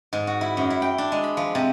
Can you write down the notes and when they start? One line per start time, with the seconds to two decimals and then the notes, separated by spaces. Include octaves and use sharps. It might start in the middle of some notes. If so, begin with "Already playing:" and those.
0.13 G#2
0.27 F#4
0.41 E4
0.57 F#2
0.70 E4
0.82 G5
0.98 D4
1.12 G#3
1.24 B5
1.37 F3
1.55 C3